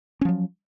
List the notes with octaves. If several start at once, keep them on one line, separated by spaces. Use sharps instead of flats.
F3 F#3 C#4